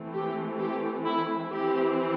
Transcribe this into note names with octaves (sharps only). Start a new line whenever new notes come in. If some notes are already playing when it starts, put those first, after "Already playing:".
Already playing: E3 A3 C4
G4
G4
E4
E3 C4 E4 G4